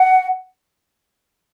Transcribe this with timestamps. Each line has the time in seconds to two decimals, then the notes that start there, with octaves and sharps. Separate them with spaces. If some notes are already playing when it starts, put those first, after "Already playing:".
Already playing: F#5